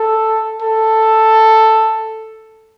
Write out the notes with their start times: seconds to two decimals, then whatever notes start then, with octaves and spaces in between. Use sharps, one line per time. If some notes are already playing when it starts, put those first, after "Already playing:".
Already playing: A4
0.62 A4